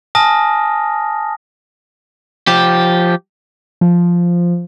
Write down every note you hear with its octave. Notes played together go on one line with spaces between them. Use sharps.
G#5 A5 D#6 F6 A#6
F3 G4
F3